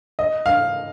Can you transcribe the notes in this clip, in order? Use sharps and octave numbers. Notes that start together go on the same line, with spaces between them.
D#5
F5